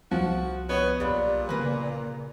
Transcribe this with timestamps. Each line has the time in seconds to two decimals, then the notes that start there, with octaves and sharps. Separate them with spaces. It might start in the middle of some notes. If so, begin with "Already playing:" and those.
0.11 C2 F3 F#4
0.69 B3 C#5 D#5
1.00 B1 A#2 G3 D4
1.49 C#3 A#3 B4 G#5 A#5